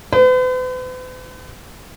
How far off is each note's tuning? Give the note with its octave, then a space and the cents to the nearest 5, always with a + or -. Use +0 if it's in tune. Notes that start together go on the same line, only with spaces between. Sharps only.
B4 +45